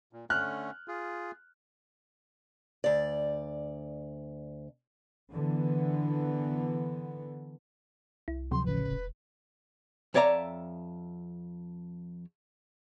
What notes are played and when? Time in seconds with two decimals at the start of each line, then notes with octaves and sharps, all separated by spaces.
0.13 A#2
0.30 D3 A3 C#4 F6 F#6
0.88 F4 G#4
2.84 D2 D5
5.33 D3 E3 B3
8.28 C2 E4
8.51 D2 C3 F3 F#3 C6
8.65 A1 C#3 B4
8.89 E1
10.14 F2 C#5 D5 E5 A#5